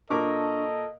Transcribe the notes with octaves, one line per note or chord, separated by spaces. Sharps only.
A#2 D4 A4 A#4 D#5 A5 C#6 D6